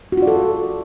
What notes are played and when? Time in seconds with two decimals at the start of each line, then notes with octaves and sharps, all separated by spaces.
0.12 F#4
0.17 F4
0.22 D5
0.27 A4